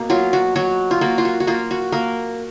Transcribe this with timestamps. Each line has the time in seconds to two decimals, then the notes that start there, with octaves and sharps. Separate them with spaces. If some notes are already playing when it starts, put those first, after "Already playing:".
Already playing: B2 A#3
0.10 F#3 F4
0.33 F#4
0.56 F#3 F#4
0.91 F4
1.01 A#3 F#4
1.18 F4
1.25 F#4
1.40 F#4
1.47 A#3 F4
1.71 F#4
1.92 A#3 A#4